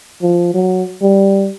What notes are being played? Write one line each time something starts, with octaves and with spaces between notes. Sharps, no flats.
F3
F#3
G3